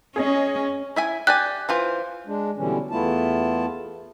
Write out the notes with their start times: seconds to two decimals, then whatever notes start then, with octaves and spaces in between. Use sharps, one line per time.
0.16 C#4 G#4 C#5 D#5
0.96 E4 E5 G#5
1.27 G4 D5 G#5 F#6
1.69 E3 F4 C5
2.26 G#3 D4
2.57 B2 D3 E3 G3 C#4
2.91 E2 A3 B3 E4 F4 A5